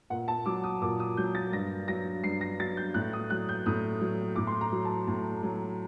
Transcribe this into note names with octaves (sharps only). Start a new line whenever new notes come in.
A#2 F#5
A5
F#3 D6
D#6
A#2 D6
D#6
F#3 G6
A6
G2 A#6
F#3 A#6
G2 C7
A#6
F#3 A6
G6
A2 F#6
D#6
F#3 F#6
G6
A2 D#6
F#3
A2 D6
C6
A#5
F#3
A5
A2
F#3